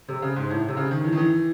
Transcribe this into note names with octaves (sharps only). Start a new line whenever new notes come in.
C3
C#3
G#2
A2
C3
C#3
D#3
E3
D#3
E3